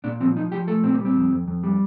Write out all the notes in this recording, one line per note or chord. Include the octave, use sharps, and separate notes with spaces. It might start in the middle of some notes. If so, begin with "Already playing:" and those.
A#2 D4
F3 C4
F3 D#4
F3 G4
A3 A4
A#2 C4
A#3
G3
C4
F2
F2
F2
G3